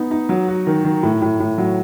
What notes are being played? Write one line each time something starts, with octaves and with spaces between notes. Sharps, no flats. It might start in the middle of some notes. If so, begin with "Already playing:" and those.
Already playing: B3 D#4
D#4
F#3
F#4
D#3
D#3
A2
A2
A2
F#3